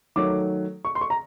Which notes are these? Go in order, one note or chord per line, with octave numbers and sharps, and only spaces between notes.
D#3 F#3 A3 D6
C#6
C6
C#6
A#5